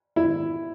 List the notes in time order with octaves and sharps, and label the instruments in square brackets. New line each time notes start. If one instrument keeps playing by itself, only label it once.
[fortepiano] E4